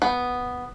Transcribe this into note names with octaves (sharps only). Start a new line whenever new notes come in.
B3